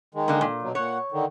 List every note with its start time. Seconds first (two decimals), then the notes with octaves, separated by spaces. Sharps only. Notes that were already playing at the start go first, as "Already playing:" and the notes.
0.15 D#3 G#3
0.28 D3 A#3
0.41 A#2
0.62 B2 F#3
0.75 A#2 C#5 F#5
1.12 D3 D#3